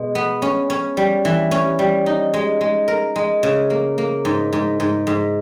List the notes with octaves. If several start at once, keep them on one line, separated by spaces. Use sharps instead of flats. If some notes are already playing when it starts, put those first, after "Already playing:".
Already playing: B2 G#3
B3
C#4
C#4
G3
E3
C#4
G3
D#4
G#3
G#3
A#4
G#3
C#3
A#3
A#3
G#2
G#2
G#2
G#2